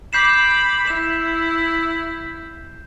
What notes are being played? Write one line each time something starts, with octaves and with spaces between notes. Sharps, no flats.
B5 D6 G6 C7 E7
E4 E7